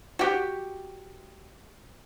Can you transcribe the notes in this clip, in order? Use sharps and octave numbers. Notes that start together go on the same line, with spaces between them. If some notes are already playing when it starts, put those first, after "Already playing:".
F#4 G4